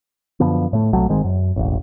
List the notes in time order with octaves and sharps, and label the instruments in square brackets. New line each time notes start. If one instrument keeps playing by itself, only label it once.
[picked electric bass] F#2 D3 F3 B3
A2 A3
B1 C3 F#3 A3
G1 D#3 G#3 C4
F#2
E1 A1